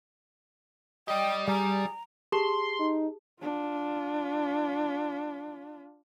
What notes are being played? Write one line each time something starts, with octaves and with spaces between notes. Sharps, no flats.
G4 D5 D#5 G5
G3 G#4 A#5
G4 G#4 A5 C6 G7
D#4
D4 F4